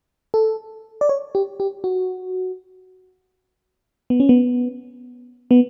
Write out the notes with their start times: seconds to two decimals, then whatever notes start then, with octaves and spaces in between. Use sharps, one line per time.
0.34 A4
1.01 D5
1.09 C#5
1.35 G4
1.60 G4
1.84 F#4
4.10 B3
4.20 C#4
4.29 B3
5.51 B3